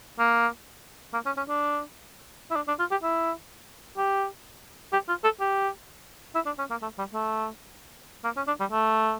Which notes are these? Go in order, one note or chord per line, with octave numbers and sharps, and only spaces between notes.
A#3
A#3
C#4
C#4
D4
E4
D4
D4
F4
G4
E4
G4
G4
F4
A4
G4
E4
D4
C#4
A#3
A3
G3
A3
A#3
C#4
D4
G3
A3